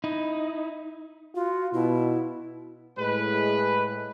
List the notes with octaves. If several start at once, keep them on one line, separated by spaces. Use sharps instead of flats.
D#4 E4
F4 F#4
B2 E4
A2 G#3 B4